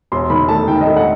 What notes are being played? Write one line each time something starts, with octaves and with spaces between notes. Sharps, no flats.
E1 C6
D#3 B5
A3 A5
D#3 G5
D#5
A3 E5
F#5